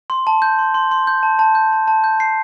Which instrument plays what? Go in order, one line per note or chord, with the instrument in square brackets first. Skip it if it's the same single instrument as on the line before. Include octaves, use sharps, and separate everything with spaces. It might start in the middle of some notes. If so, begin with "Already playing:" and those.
[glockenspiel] C6
A5
G6
C6
C6
C6
G6
A5
A5
G6
A5
A5
G6
C7